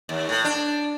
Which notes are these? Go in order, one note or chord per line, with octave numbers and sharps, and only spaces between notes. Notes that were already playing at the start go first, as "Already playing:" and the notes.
D#2
A2
D4